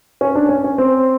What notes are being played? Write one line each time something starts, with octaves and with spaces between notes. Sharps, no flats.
C#4
D4
C#4
C#4
C4